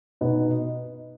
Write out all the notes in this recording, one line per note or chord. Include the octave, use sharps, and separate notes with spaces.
B2 B3 D#4